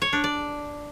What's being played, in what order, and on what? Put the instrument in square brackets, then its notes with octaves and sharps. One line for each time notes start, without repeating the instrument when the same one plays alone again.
[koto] C#5
D4
D5